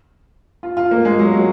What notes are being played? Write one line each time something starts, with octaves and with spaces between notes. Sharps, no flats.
F4
F4
A#3
G#3
F#3
F#3